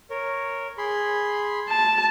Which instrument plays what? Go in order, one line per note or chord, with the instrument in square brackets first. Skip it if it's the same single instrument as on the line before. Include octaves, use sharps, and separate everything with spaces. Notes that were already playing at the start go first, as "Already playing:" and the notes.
[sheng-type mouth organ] A#4 C#5
G#4 B5 C6
[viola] A5